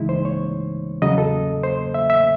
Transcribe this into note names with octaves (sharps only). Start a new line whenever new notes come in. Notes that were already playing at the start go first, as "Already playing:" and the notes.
Already playing: C#2 C#3 E3 G#3 D#4 E4
C5
C#5
E2 C#3 F#3 D#5
A4
C5
E5
E5